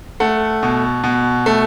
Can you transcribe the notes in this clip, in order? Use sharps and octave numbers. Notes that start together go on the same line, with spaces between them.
A3 F#5
B2
B2
A3